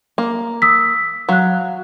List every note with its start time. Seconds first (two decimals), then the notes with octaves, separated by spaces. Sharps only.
0.18 A#3
0.62 D#6 E6 B6
1.29 F#3 F5 F#6